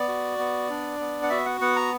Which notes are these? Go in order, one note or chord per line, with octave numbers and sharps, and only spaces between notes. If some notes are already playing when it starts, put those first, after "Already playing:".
Already playing: B3 D5
F#4
B3
D4
B3
F#5
F#4 E5
F#5
B3 F#5
A#5